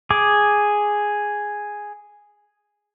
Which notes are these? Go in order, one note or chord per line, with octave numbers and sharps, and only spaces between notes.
G#4 D6